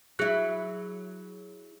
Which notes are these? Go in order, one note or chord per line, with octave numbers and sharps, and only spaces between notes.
F#3 E4 G#4 F#6